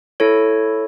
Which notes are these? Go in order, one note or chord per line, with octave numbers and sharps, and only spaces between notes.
E4 A4 C#5